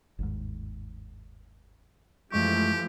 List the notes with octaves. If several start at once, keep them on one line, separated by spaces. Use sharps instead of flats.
G1 D#2 G#2
F#2 E3 F3 G#3 A3 G4 C#6